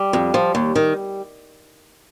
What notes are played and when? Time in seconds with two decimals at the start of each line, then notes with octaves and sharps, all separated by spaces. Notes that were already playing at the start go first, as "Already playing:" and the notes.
Already playing: G3
0.13 F2
0.34 F3
0.55 D#2
0.75 D#3